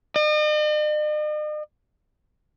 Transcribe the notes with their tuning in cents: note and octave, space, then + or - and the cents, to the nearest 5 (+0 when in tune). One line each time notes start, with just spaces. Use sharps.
D#5 -45